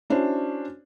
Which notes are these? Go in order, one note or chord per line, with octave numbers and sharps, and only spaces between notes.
C#4 D4 E4 F#4 C5 C#5